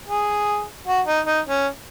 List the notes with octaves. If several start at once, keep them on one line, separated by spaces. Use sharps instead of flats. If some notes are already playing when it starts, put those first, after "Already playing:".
G#4
F#4
D#4
D#4
C#4